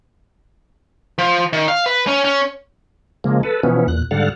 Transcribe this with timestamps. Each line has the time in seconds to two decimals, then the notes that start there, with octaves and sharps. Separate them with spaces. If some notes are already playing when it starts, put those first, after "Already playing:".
1.18 F3
1.53 D#3
1.68 F5
1.86 B4
2.07 C#4
2.25 C#4
3.24 C#3 F3 G#3 A#3
3.43 A4 B4
3.63 B2 E3 F3 B3 C#4
3.88 E2 A#2 F#6
4.11 G#2 D3 G3 A4 F5 F#5